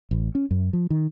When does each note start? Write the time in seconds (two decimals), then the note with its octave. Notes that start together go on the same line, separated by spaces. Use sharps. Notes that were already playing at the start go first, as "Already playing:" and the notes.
0.11 A1
0.35 C#4
0.51 F#2
0.73 F3
0.90 D#3